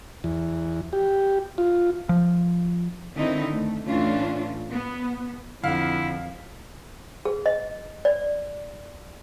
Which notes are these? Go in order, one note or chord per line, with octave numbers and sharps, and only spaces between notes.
E2
G4
F4
F3
D3 D#3 C4 D#4 E4
A3
A2 E3 A3 C#4 D4 F4
B3
F2 D3 E4 F5 F#5
G#4
D#5
D5